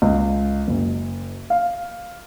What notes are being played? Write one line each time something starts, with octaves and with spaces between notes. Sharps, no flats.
C#2
F#1
F5